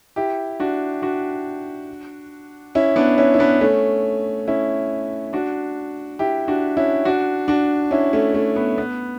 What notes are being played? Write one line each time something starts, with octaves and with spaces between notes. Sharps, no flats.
E4 G4
D4 F#4
D4 F#4
C#4 E4
B3 D4
C#4 E4
E4
B3 D4
A3 C#4
C#4 E4
D4 F#4
E4 G4
D4 F#4
C#4 E4
D4 F#4
D4 F#4
C#4 E4
A3 C#4
A3
B3
B3